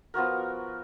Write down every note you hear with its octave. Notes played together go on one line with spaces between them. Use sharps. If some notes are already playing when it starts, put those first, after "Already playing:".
F3 B3 F#4 A#4